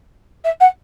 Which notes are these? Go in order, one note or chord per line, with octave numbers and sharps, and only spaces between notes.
E5
F#5